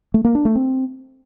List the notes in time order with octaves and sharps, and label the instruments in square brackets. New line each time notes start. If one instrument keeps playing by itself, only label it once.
[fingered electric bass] A3
A#3
D4
A3
C4